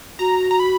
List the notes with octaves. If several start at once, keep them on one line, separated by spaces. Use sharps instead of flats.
F#4 A#5
A#5
B5